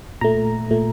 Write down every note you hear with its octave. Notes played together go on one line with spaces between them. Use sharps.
A#2 A3 A#5
A#2 A3